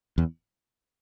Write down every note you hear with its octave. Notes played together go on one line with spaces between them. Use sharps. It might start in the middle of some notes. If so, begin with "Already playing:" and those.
E2